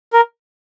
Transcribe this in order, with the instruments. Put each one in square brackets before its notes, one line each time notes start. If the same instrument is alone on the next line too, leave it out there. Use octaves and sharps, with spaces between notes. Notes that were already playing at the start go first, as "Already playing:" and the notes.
[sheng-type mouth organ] A#4